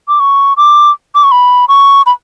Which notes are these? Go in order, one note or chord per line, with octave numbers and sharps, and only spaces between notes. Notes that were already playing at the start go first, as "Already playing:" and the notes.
D6
C#6
D6
D6
C#6
B5
C#6
B5